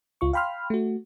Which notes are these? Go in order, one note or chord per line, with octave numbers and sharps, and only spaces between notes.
C#2 F4 C#6
F5 G5 B5 C6 F6
A3 F#4